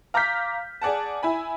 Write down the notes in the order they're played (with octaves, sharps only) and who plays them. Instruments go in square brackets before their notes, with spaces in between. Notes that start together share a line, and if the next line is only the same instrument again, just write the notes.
[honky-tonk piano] F5 A#5 D6 F6 G6 B6
G#4 D5 F#5 A5
E4 G#5 B5